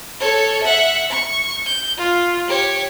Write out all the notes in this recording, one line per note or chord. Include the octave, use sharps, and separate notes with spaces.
A4 C#5
E5 F#5
C#6
G6
F4
G4 C#5